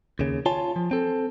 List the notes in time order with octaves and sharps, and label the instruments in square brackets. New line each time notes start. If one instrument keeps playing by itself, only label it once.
[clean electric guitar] D#2 C#3
F4 C#5 G#5 A5
F3
C4 A4